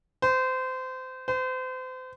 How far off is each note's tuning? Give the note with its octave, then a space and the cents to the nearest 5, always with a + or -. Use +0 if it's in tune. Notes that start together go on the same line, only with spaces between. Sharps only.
C5 -25
C5 -35